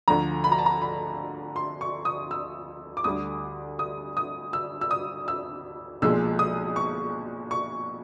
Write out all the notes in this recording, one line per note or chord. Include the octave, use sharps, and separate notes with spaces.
D2 D3 F3 A#5
B5
A#5
A5
A#5
B5
C6
C#6
D#6
E6
D6
D2 D3 G3 D#6
D#6
D#6
E6
E6
D#6
E6
B1 A#2 F3 G#3 E6
D#6
C#6
C#6